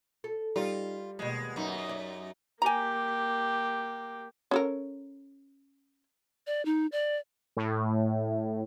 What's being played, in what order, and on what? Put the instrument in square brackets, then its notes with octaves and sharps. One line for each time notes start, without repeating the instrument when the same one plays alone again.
[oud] A4
[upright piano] G3 [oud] D#4 [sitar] F4
[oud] D#2 B2 [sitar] G#3
[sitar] F#2 D#4
[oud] D5
[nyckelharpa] A#3 G4 [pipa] G#5 A#5
[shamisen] C#4 A4 A#4
[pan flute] D5
D#4
D5
[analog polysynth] A2